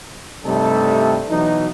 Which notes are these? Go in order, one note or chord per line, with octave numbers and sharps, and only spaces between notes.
G2 C3 G3 A3 D#4 A4
B2 E3 F#3 D#4